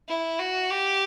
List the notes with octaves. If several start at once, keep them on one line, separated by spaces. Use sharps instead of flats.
E4
F#4
G4